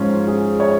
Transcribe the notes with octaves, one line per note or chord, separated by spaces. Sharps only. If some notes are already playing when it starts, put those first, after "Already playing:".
Already playing: G#2 F3 C#4 F4
G#4
C#5